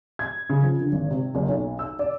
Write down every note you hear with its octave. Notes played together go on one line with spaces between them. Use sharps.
G#6
C#3
F3
D3
G#1
C3
F#1
B1
E6
D5